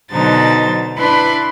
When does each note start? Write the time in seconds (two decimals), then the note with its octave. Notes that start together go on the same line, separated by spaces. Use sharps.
0.11 B2 D3 F#3 D#4 C5 A6
0.97 D4 E4 B4 B5 C6